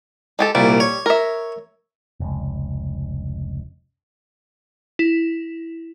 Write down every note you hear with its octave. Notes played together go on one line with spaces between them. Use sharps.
G#3 G4 A4
C2 A#2 G3
C#5
A#4 E5
F1 C#2
E4